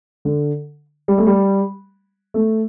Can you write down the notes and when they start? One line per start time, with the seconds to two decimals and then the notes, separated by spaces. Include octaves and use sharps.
0.25 D3
1.08 G3
1.18 A3
1.27 G3
2.34 A3